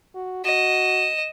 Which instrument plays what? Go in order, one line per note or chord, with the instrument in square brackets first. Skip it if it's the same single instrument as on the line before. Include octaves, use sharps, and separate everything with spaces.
[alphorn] F#4
[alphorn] F#4 [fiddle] D#5 [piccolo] E7